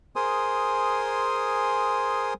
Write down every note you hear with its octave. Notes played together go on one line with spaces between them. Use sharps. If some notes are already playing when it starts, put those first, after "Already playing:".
G#4 A#4 C5 G#5 C6 D#6